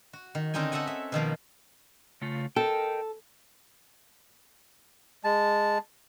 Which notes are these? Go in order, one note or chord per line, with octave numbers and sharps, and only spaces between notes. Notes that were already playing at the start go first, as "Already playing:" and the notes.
F#4
D#3
D3 C4 C#4 D#4 G5 G#5
A4 D#5 E5 F#5 G#5
E5
B2 D#3 F3 A#3
C#3 A3 F4
A4 A#4 D#5 G5
G#3 A5